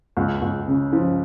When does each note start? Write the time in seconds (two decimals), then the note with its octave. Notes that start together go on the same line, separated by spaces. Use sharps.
0.17 C#2
0.42 C#2
0.67 C#3
0.93 F3